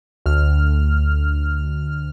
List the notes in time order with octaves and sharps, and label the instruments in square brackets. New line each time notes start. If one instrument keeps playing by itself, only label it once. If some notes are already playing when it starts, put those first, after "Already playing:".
[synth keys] D2 F6